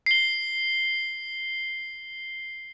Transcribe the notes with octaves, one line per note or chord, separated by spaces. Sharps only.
C7 G7